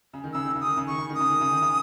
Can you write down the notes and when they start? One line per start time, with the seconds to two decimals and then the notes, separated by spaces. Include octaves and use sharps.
0.13 C#3
0.24 D#3
0.33 C#3 E6
0.45 D#3
0.55 C#3
0.61 D#6
0.67 D#3
0.77 C#3
0.87 D#3 C#6
0.98 C#3
1.09 D#3
1.15 D#6
1.20 C#3
1.30 D#3
1.41 C#3
1.52 D#3
1.62 C#3